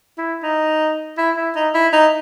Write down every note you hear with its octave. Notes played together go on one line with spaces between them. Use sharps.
E4
D#4
E4
E4
D#4
E4
D#4